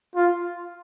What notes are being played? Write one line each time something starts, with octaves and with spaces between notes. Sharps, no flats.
F4